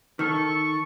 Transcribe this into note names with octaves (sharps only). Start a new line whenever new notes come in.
D#3 A4 C#6